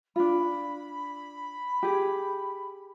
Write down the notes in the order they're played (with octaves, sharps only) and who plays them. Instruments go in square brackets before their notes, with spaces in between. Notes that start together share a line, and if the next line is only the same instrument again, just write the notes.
[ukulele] D4 F4 [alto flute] B5
[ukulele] G4 G#4